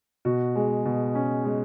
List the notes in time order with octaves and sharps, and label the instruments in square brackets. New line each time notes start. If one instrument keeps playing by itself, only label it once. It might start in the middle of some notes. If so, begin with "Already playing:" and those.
[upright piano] B2 F#4
G#3
B2
C#4
G#3